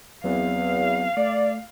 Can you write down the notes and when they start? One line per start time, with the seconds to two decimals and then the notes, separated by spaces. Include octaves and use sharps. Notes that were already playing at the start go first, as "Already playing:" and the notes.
0.24 E2 F#3 B3 C4 F5
1.17 A3 D5